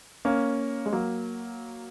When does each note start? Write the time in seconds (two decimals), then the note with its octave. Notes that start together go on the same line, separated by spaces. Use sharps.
0.25 A#3 C#4
0.86 G#3
0.93 F#3 A#3